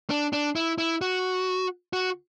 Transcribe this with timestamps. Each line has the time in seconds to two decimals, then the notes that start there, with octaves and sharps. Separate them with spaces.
0.10 D4
0.33 D4
0.56 E4
0.78 E4
1.01 F#4
1.93 F#4